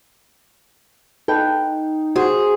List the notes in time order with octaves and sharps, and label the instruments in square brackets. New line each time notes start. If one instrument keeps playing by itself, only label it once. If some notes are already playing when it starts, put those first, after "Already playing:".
[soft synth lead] D#4 [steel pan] A4 B4 [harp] G5
[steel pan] F#4 [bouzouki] G#4 [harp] C5